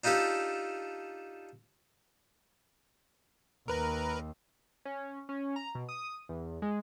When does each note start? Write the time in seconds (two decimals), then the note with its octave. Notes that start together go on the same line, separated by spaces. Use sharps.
0.04 D4 D#4 F4 G4 A4
3.68 D#2 A#4 B4 A#5
4.85 C#4
5.29 C#4
5.56 A#5
5.75 B2
5.89 D#6
6.29 E2
6.62 G#3